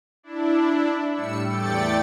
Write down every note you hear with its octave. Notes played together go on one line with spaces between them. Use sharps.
D4 E4
A2 G3 E6 C#7
E2 A3 D5 G5 A6 C#7